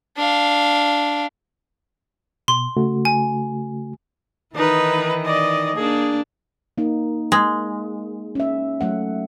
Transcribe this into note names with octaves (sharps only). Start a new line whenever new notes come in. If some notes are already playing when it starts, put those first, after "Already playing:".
D4 F5
B2 C6
C#3 A3 F#4
G#5
D#3 E3 D#4 B4
D5 D#5
A#3 D4 G#4
A#3 D#4
G#3
C#4 E5
F#3 A3 F#5